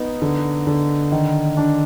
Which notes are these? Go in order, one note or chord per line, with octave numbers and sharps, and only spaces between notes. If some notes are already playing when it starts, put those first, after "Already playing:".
Already playing: B3 D#4
D3
D3
D#3
D4